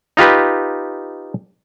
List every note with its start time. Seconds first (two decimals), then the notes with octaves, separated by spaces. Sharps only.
0.17 D#4 F4 G4 B4